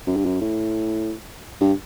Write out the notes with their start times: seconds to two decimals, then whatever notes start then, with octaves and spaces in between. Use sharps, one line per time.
0.07 F#2
0.17 G2
0.26 F#2
0.41 A2
1.61 G2